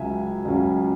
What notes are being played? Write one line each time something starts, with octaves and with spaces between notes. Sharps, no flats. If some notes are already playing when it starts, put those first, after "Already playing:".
Already playing: C#2 C#3 F#3 E5 G#5
C#2 C#3 F#3